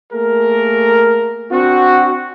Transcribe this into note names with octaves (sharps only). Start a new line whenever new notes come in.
A3 A#3 G#4 A#4
C4 D4 F#4